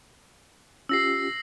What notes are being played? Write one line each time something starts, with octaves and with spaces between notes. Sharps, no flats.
C#4 F4 G4 E6 A#6 C7